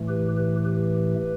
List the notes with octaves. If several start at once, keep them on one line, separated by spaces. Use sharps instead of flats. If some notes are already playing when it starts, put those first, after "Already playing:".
Already playing: A2 E3 A3
G4 B4
G4 B4
G4 B4